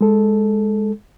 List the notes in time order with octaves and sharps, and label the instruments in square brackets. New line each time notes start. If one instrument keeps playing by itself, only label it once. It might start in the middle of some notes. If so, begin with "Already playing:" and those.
[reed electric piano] G#3 A4